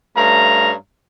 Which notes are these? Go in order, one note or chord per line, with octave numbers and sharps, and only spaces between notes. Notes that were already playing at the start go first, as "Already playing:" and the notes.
G2 A3 C#4 F5 A#5